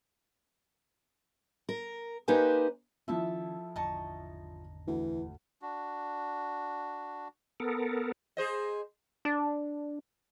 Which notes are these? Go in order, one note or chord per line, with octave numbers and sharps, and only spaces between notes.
A#4
A#3 D#4 G4 B4 C5 G#5
D#3 F3 C#4 E4 A4 E5 A5
G#1 E2 D3 D#4 A5 C#6
D2 E3
D4 F#4
B3 A4 A#4
G#4 C5 D#5
D4